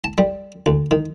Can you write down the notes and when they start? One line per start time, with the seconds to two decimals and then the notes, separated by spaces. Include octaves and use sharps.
0.04 A5
0.18 G3
0.66 D2
0.91 D#3